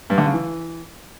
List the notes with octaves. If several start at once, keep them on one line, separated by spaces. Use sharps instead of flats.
G2
D3
C#3
E3